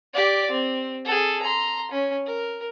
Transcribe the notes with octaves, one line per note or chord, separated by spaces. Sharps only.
G4 D5
C4
G#4 A4
A#5 C6
C#4
A#4